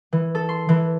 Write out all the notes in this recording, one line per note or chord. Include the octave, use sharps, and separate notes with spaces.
E3
A4
C6
E3